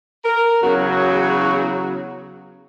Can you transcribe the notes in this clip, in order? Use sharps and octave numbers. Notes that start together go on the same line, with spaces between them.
A#4
E2 C#3 F#3 F#4